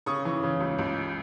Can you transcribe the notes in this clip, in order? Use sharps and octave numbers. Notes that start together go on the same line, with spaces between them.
C#3 C#6 D#6
E3
C#3
C#2
C#2